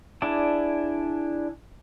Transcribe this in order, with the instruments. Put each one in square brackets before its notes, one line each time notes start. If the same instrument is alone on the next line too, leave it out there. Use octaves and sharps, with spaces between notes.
[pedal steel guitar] D4 E4 G#4 D5 A5